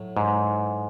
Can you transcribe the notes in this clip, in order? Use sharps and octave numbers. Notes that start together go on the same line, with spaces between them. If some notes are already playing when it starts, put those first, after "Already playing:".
Already playing: A2 F#3
G#2